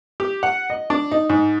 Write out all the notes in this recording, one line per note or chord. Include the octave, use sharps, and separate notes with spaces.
G4
F#5
D#5
D4
D#4
G#2